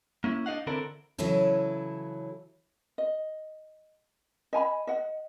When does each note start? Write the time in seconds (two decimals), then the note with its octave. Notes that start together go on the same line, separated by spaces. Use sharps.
0.24 A#3 C#4 E4
0.46 D4 D#4 G4 D#5 F5 F#5
0.67 D3 C4 D4 E4 A4 A#4
1.18 C#3 E3 F#3 C#4 E4 A4
2.98 D#5
4.53 D#5 G#5 A#5 B5
4.87 D#5 F#5